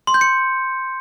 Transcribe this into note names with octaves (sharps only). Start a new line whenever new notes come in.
C6
G6
C#7